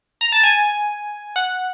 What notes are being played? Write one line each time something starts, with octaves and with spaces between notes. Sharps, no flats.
A#5
A5
G#5
F#5